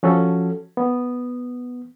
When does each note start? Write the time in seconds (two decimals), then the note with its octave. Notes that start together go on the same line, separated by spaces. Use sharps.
0.03 F3 C#4 F#4 A4
0.77 B3